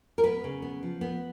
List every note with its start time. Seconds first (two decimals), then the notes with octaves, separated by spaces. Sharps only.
0.18 A#4
0.24 B3 B4
0.44 C#3
0.62 B3
0.83 F3
1.01 B3